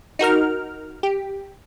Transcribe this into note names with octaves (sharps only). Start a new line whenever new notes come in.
D#4 F#4 A#4 F6
G4